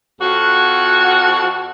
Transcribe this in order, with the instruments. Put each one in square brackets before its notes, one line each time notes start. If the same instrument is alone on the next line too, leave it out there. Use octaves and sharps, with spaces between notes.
[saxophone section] F2 F#4